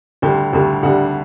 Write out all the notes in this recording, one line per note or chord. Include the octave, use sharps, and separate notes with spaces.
D2 D3 G3 G5
D2 D3 G3
D2 D3 G3 F#5